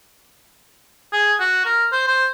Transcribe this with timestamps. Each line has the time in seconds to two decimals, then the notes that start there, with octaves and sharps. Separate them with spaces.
1.13 G#4
1.39 F#4
1.65 A#4
1.92 C5
2.07 C5